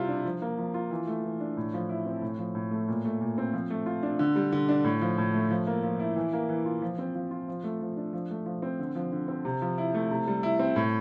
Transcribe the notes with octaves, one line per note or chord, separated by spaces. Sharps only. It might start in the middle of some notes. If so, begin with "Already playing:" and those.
Already playing: C3 G3 E4 F4
D4
F3
A#3
F3
F4
E3
A3
E3
D4
A2
F3
E4
C4
A2
F3
A2
A3
A#2
A3
A#2
C4
F3
A3
F4
D4
D3
G3
D3
D4
A2
F3
A2
A3
F3
A#3
F3
E4
E3
A#3
E3
F4
F3
C4
F3
F4
F3
A3
F3
D4
F3
A3
F3
C4
D3
F3
D3
C4
C3
F3
E4
A3
C3
G3
E4
C4
A2